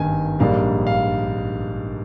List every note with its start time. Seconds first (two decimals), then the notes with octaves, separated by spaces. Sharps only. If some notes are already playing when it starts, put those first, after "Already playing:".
Already playing: G#1 G2 D#3 A#3 G#5
0.39 A#1 G#2 G3 A#3 D4 F5
0.87 F5